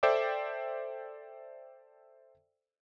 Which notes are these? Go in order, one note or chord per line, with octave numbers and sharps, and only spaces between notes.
A4 C5 D5 E5 G5 D6